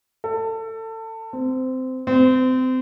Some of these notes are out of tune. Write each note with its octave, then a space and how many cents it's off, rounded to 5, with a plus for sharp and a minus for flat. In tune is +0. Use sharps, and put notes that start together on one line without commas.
A4 +25
C4 -20
C4 -30